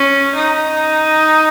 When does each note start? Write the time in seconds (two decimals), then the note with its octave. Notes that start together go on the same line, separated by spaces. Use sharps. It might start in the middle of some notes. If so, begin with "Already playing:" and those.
Already playing: C#4
0.35 D#4